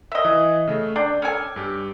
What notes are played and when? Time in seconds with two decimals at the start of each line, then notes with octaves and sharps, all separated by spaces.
0.12 D#5 E5
0.25 E3
0.67 C#3 A3
0.96 D4 G5 D6 G6
1.22 C#4 A4 G#5
1.56 G2 G4